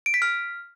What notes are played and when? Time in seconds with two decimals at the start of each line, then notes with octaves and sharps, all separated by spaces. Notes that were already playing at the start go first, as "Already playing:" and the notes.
0.06 D7
0.14 B6
0.22 F6